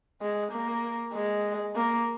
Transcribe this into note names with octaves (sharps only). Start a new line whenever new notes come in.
G#3
A#3
G#3
A#3